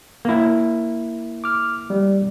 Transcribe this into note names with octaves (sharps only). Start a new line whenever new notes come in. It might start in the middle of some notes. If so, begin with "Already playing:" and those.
A#3 E4
D6 F6
G3